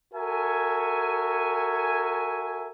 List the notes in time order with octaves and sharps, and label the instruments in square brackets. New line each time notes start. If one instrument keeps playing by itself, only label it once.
[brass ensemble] F#4 A4 A#4 E5 G#5